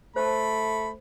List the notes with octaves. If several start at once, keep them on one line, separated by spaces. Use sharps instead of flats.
A3 C5 A5 B5